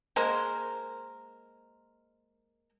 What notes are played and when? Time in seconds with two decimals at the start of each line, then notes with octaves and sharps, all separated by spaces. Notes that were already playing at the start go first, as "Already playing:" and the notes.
0.16 G#3 A#3 A#4 C5